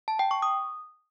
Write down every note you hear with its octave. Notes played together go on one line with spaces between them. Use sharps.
A5
G5
C#6
D#6